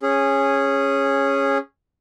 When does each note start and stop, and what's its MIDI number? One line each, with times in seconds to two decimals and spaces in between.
0.03 1.58 61
0.03 1.58 68